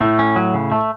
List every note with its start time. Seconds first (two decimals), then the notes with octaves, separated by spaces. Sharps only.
0.01 A2 A3
0.19 C#4
0.36 F#3
0.54 C#3
0.72 A3